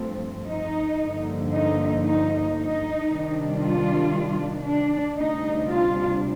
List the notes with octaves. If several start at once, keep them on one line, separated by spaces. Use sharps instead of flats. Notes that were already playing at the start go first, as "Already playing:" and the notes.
Already playing: G2 F3 A3 C4
D#4
G2 D3 F3 A#3
D#4
D#4
D#4
C3 D#3 G3 D4
F4
D4
D2 C3 G3 D4 D#4
F4